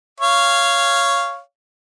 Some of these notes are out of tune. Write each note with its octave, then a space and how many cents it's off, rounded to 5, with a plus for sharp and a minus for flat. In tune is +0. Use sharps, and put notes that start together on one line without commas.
C#5 +0 F5 -10